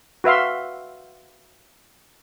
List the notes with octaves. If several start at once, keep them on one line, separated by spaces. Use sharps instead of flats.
F#4 B4 E5 F5 C6